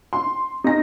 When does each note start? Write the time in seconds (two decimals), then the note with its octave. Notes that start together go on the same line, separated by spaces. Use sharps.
0.13 C6
0.64 D#4 A#6